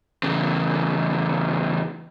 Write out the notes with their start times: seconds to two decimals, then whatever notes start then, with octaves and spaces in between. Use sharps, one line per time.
0.23 E2 C#3